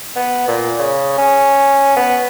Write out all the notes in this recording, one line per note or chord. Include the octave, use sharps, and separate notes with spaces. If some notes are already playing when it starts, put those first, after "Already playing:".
B3
A#2
C#3
C#4
B3